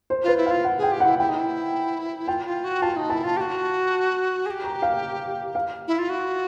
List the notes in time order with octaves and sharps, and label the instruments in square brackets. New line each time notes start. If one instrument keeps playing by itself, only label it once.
[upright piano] C5
[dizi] F4 [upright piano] B4
[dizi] E4
[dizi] F4 [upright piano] F5
[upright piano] F#5
[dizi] G#4 [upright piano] G5
[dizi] G4
[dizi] E4 [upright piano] F#5
[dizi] E4 [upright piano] G5
[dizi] D#4
E4
[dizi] F4 [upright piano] G5
[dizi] F4
F#4
[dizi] F4 [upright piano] A5
[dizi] D#4
[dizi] E4 [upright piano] A5
[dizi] F4
G4
F#4
G#4
G4
[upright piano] A#5
F5
F5
[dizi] E4
F4
F#4